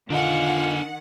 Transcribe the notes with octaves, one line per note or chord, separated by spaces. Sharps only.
D3 D#3 D4 F4 D#5 F5 F#5 G#5